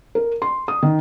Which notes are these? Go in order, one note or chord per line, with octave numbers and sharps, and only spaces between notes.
A#4
C6
D#6
D#3